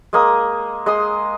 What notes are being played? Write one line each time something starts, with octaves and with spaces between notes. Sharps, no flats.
G#3 A#3 D#6
G#3 C6 D#6